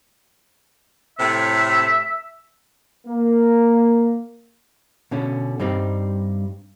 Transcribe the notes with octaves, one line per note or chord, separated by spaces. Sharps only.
A2 C3 E5
A#3
B2 D3 C#4
G2 G3 C4 D#4